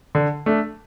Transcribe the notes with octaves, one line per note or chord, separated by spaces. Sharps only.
D3
A3 D4